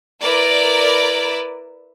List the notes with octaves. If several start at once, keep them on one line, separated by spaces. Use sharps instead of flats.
E4 A#4 B4 D5